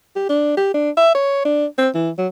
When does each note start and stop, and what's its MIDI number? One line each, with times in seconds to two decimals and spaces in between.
0.16 0.27 67
0.29 0.57 62
0.57 0.73 67
0.74 0.90 62
0.97 1.12 76
1.15 1.40 73
1.45 1.66 62
1.78 1.89 60
1.94 2.10 52
2.18 2.27 54